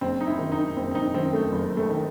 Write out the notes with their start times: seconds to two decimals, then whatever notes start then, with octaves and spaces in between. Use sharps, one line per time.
0.01 F#1 C4
0.21 D#4
0.27 E4
0.39 F#2 D#3
0.52 D#4
0.77 F#1 C4
0.91 C4
0.95 D#4
1.14 F#2 D#3 C4
1.33 A3
1.52 F#1
1.77 A3
1.89 D#3